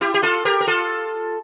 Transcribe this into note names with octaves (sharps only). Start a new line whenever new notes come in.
E4 G4
G4
F4 A4
G4 A#4
A#4
F4 A4